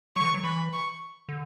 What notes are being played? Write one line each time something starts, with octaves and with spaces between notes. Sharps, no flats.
F#3 C#6
D3
E3
F#3
E3 B5
C#6
D3